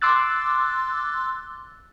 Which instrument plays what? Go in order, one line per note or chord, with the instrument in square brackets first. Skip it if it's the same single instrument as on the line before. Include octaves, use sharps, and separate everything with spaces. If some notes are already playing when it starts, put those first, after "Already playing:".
[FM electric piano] C6 D6 E6 F#6 A6